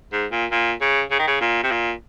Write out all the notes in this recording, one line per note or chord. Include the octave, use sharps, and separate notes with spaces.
G#2
A#2
A#2
C#3
C#3
D#3
C#3
A#2
C3
A#2